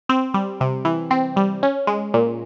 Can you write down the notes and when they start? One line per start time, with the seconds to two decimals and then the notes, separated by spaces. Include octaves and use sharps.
0.09 C4
0.34 G3
0.61 C3
0.85 E3
1.11 C4
1.36 G3
1.63 C#4
1.87 G#3
2.14 A#2